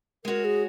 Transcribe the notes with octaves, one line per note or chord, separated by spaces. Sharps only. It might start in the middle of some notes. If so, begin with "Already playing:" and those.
G#3 F#4 A#4 C#5
G#4